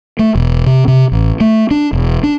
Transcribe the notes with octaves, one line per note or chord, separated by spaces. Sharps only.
A3
E1
C3
C3
A1
A3
D4
E1
D4